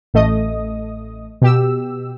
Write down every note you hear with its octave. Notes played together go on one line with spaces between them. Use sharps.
A1 A3 D#5 D#6
B2 G4 E6